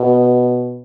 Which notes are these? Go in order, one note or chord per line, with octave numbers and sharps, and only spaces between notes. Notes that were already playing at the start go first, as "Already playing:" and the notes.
Already playing: B2